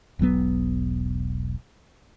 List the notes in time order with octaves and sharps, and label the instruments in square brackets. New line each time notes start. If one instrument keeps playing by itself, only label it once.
[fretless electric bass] E1 B1 F#3 B3